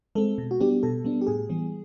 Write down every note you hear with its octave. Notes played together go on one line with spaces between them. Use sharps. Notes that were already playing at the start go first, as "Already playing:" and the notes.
G#3 C4 A4
B2
F#4
G3 B3 D4 G4
B2 A4
G3 B3 D4
G4
A2 G#4
E3 G3 B3